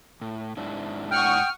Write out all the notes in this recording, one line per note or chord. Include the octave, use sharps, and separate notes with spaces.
A2
G#2 D4 E4
F#5 G5 C#6 D#6 F6